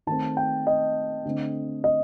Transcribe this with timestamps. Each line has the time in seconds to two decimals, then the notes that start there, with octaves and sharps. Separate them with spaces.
0.07 D#3 A3 C4 A5
0.37 G5
0.67 D#5
1.25 D3 A3 C4
1.84 D#5